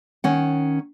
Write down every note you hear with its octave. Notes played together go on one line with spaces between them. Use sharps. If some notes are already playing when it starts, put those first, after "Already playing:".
D#3 C#4 F#5